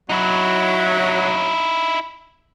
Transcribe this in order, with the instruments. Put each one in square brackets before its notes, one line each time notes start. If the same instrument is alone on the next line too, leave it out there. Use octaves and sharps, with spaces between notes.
[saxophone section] F#3 [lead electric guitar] D#4 E4